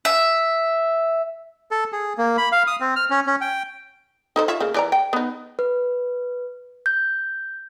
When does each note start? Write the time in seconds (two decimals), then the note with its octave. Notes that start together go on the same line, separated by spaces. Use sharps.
0.05 E5
1.71 A4
1.92 G#4
2.18 A#3
2.38 B5
2.52 F5
2.67 D#6
2.80 C4
2.96 F6
3.10 C#4
3.27 C#4
3.41 G5
4.36 D#4 A4 C5
4.48 F4 C#5 E5
4.60 C#3 A#3
4.74 E3 D5 A#5
4.92 G5
5.13 B3 D#4
5.59 B4
6.86 G6